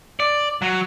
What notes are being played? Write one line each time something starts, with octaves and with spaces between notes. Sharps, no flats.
D5
F#3